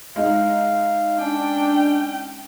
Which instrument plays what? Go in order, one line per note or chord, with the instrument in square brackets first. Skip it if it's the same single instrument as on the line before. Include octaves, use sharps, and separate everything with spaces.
[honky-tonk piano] G#3 D#4 [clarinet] F5
[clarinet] C#4 [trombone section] D4 [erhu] G5